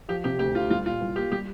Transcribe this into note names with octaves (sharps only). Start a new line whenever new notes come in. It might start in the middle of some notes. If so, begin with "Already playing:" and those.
F3 G4
C3 G4
D2 G4
D2 F4
G3 F4
A#2 F4
C2
A#3 G4
G3 G4